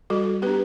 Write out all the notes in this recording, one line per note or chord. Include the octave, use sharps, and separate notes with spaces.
G3 F#4 A4
B3 D4 G4 B4